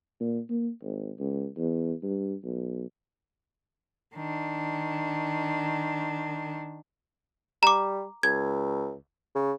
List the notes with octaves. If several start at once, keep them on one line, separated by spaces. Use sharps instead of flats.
A#2
A#3
G#1
C#2
E2
G2
B1
D#3 D4
G3 A#5 D6
C#2 G#6
C#3